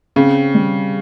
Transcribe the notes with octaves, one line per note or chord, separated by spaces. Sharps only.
C#3 C4
G3